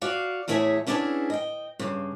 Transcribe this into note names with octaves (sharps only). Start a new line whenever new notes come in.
F#4 D5 F5
E2 A2 E4 G#4 C#5 E5
B3 C#4 D4 E4 G4 G#4
D#5 G5
G2 C#3